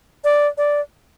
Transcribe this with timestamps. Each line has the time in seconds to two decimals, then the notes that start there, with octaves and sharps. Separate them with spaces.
0.24 D5
0.58 D5